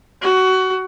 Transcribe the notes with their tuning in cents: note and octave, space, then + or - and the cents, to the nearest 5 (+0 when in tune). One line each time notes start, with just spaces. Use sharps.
F#4 +20